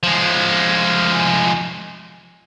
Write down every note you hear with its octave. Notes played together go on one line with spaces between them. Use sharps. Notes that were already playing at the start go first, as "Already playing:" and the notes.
F3 G#3